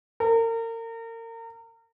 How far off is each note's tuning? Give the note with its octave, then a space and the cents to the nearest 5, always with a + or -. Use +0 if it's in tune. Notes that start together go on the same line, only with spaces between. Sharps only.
A#4 -35